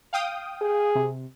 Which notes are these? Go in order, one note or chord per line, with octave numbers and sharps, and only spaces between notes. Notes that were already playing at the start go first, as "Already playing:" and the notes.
F5 G5 D#6
G#4
C3